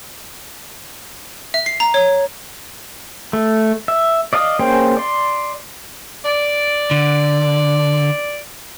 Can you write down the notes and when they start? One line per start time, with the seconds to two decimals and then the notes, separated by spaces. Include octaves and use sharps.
1.54 E5
1.66 C7
1.80 A#5
1.94 C#5
3.33 A3
3.88 E5
4.33 D5 D#5 F5 A5 D#6
4.59 A#3 C#4 G#4 C5 G5
4.97 D5 C6
6.25 D5
6.91 D3